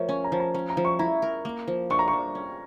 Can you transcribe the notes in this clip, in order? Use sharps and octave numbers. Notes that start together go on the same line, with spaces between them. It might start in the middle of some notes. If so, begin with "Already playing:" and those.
Already playing: F3 A3 A#4 C#5
C#4 C#6
A#5
F3 A5
A#5
C#4 A#5
A#5
F3
C#6
E4 A#5
A#4
A#3
F3
D4 C#6
A#5
C#6
F3
C#4